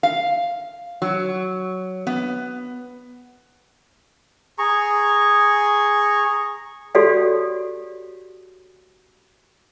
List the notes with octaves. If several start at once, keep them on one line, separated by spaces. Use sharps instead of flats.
F5
F#3
B3
G#4 A#5 C#6
F#4 G4 A4 C#5 D5 F5